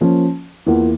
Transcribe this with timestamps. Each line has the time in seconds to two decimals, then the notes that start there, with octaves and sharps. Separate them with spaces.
0.01 F3 A#3 C#4
0.66 E2 E3 A#3 F4